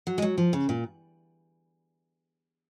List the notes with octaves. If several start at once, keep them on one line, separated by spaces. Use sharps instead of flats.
F#3
G#3
F#3
F3
C#3
A#2